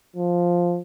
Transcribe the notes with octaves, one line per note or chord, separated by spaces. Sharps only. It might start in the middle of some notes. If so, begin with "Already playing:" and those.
F3